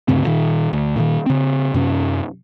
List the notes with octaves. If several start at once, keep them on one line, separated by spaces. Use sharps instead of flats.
D2 G2 C#3 C4
A#2 D#3
D2
A#2 D#3
C#3 C4
F#2 C3 C#4